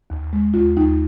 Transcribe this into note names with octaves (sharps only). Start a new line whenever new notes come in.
D#2
G#3
D#2 F4
D#2 D#4